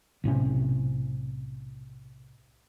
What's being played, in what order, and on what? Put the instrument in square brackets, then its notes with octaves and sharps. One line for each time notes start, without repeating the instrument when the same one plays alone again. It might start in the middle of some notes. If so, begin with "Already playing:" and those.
[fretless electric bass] B1 A2 C3 C#4